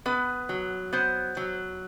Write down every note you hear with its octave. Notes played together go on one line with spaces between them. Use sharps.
B3 B4
F#3
B3 C5
F#3